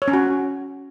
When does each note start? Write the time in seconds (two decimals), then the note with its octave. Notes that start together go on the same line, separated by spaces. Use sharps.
0.02 C#5
0.08 C#4
0.13 F#4